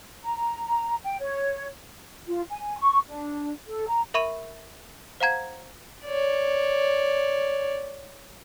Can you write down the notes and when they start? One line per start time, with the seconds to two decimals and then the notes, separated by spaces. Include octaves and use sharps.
0.25 A#5
1.04 G5
1.21 C#5
2.27 F4
2.49 G#5
2.77 C#6
3.07 D4
3.67 A4
3.87 A#5
4.14 A#4 E5 B5 C#6 D#7 E7
5.20 C5 F5 F#5 A#5 G#6
6.06 C#5 D5